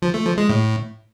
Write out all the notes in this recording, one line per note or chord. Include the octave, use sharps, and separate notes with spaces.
F3
A3
F3
G#3
A2